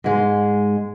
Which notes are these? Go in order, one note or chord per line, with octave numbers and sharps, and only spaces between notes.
G#2 G#3